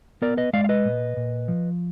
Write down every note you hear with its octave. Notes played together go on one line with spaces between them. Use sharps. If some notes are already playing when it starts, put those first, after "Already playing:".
B3 A#4 D5
B4 D#5
G#3 D5 F5
F5
B4 D#5
A#2
A#2
F3